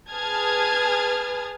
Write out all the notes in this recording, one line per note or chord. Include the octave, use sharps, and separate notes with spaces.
G#4 B4 A5 D#6 F6 G#6